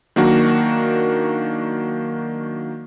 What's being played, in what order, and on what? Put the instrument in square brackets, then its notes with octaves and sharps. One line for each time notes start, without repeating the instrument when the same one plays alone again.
[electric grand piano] D#3 F#3 A#3 D4 F#4